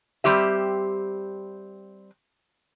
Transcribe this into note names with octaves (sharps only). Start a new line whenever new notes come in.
G3 C4 G4 E5